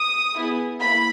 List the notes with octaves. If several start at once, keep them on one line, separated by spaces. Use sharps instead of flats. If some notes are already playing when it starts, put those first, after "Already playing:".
Already playing: D#6
B3 E4 G#4
A#3 E4 B5